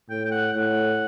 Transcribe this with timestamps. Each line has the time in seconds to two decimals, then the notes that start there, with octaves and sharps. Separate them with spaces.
0.09 A2 G5
0.25 G5
0.31 F#5
0.53 A2 F#5